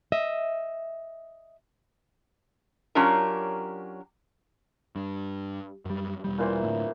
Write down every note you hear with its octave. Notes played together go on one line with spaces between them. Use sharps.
D#5 E5
F#3 C#4 D4 F4 G4 A#4
G2
F#2 G3
E1 G3
A#2 E3 C5
D2 A2